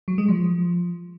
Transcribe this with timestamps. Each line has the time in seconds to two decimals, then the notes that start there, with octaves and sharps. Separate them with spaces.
0.08 F#3
0.18 G#3
0.28 F3